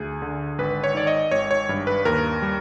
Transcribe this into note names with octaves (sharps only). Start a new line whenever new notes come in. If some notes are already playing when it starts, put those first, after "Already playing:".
Already playing: D2 G#4
D3
G#1 B4
C#5
D#3 D5
D#5
G#1 C#5
C#5
G2
B4
D#2 A#4
G3